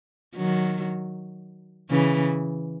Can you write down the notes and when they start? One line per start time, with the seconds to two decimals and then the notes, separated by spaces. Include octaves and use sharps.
0.36 D#3 F#3
1.90 C#3 E3